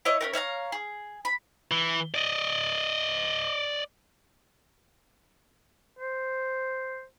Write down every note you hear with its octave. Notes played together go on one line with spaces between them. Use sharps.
E4 C#5 D#5
C#4 F#4 A#4
C#5 E5 F5 A#5
G#4
B5
E3
D5 D#5
C5